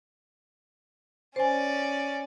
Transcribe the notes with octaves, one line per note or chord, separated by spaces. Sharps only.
C#4 C5 D5 G#5